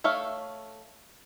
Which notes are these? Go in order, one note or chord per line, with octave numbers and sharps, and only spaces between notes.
A3 C#5 E5 F5